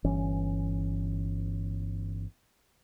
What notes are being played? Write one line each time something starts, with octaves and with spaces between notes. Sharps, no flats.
G1 E3 C#4